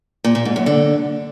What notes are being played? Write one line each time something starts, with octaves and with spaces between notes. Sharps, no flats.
A#2
A#2
G#2
F#2
D3